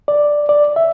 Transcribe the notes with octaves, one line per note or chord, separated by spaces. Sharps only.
D5
D5
E5